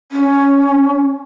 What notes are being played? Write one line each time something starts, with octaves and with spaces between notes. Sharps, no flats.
C#4